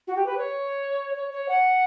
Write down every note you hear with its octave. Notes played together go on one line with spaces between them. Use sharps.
F#4
G4
B4
C#5
C#5
C#5
F#5